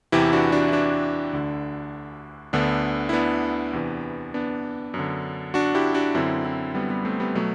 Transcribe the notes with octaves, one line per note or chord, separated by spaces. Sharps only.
E2 C3 E3 E4 G4
D4 F#4
D4 F#4
E4
D4 F#4
D2 D3
D2 D3 B3 D4
E4
B3 D4
E2 C3 E3
B3 D4
F#2
D3
D4 F#4
E4 G4
D4 F#4
F#2 D3 C4 E4
C4 E4
G3 B3
G3 B3
A3 C4
G3 B3
B2 F#3 A3